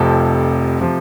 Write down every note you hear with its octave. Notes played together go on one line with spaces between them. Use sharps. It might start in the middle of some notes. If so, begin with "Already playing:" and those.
Already playing: F1 F2 C3 F3 A4
C3 F3